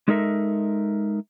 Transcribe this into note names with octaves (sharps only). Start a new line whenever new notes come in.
G#3 D#4 A4 A#4 E5